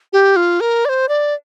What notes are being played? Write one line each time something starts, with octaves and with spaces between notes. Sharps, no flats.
G4
F4
A#4
D5
C5
D5